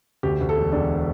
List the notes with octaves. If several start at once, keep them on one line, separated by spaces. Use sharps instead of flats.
D2 G4
D2
A4
E1
E1 D4